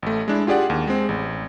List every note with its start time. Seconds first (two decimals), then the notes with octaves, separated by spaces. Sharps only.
0.02 A1 A3
0.28 G#3 D4 E4
0.47 F4 G4 G#4 D5 F#5
0.70 D#2
0.87 G#3 C4
1.09 A1